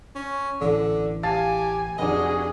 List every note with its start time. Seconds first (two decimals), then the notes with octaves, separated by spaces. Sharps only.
0.15 C#4
0.61 A1 D3
1.23 G4 F5 G#5 A5 A6
1.98 F1 D4 F#4 G#4 D#5